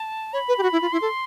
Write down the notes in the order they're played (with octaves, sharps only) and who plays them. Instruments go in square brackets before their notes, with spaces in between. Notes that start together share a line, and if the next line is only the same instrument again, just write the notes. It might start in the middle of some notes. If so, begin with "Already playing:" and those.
Already playing: [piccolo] A5
[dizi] C#5 [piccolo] B5
[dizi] B4
G4
F#4
E4
F4
[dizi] E4 [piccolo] C6
[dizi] A4